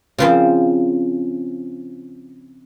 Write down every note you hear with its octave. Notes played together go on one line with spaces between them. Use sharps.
C#3 F3 C4